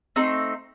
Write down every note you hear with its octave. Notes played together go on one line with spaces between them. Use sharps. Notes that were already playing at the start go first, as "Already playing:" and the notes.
A3 C4 D#4